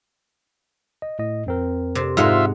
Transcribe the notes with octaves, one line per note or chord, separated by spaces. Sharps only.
D#5
A2 D#5
F2 C4 A#4
C3
G#2 D#4 F4 E5 F#5